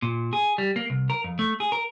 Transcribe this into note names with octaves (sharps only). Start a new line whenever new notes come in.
A#2
G#4
G3
A#3
C2
A#4
F2
A3
G#4
A#4